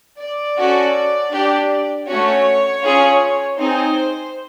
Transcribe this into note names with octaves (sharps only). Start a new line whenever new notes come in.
D5
C#4 F#4 A4
D4 G4
A3 C#4 F#4 C#5
C#4 F4 G#4
C4 D#4 G#4 C5